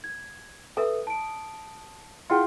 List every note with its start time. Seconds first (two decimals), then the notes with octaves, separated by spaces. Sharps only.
0.04 G#6
0.77 A4 B4 E5 D#6
1.07 A5 D7
2.30 E4 F4 G#4 F#5 G5